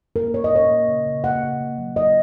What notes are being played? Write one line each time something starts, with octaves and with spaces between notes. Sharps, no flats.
A#3 A#4
A#2 C#5
D#5
A#2 C#5
A#3
C#3
C#3
A#3 F#5
C#3
A#3
F#3
F#3 D#5